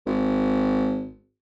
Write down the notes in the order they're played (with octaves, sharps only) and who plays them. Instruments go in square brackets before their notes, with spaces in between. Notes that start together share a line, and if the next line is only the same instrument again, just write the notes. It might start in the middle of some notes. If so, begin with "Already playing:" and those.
[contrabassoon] G#1